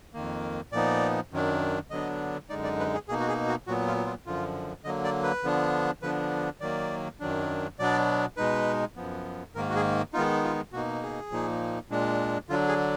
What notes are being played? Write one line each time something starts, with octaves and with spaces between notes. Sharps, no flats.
F2 D#3 A#3
A#2 F3 B3 D#4 D5
F#2 D#3 F#3 D4
D3 F#3 B3 D4 D#5
F#2 D3 G#3 D#4 D5
D5
B4
G#4
B2 A#3 D#4 G#4
F#4
G#4
F#4
A#2 F#3 B3 F#4
F4
F4
F#2 D3 F3 F4
D3 F#3 A#3 D#5
D5
B4
D3 F3 B3 D4
D3 F3 B3 D4 B4
D#3 F#3 A#3 D5
F#2 D#3 F#3 D4
B2 F#3 B3 D4 D5
B2 G#3 D#4 B4
F#2 F3 B3
G#2 D#3 A#3 A#4
F#4
G#4
D#3 G#3 B3 D#4 F4
F4
B2 A#3 D#4 F#4
G#4
A#2 F3 A#3 D#4
A#2 G#3 D4
D3 F#3 D4 F4
G#4